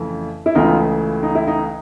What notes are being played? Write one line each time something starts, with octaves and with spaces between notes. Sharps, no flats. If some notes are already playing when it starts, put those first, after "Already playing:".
Already playing: F2 C#3 E3 A3
E4
C#2 C#3 E3 A3 D#4 F4
D#4
E4
D#4